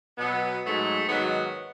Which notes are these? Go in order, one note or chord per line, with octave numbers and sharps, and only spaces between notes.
B2 F#3 B3
G#2 F#3 A3
G#2 D#3 F#3 B3